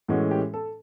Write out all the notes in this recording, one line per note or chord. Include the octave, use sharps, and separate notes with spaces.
A2 E3 G#3 C#4 F#4
G4
A4